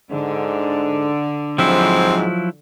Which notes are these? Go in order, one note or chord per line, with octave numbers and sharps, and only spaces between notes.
G#2 D3
G#2 F3 F#3 C4 E4